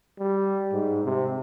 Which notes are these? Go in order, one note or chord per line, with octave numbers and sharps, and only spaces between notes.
G3
G#2
C3